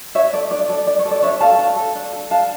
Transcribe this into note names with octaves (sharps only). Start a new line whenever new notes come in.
D4 C#5 E5
A4 D5
D4 D5
A4 D5
D4 D5
C#5
A4
D5
D4 C#5 E5
A4 F5 A5
D4
A4
D4
A4
D4 F5 A5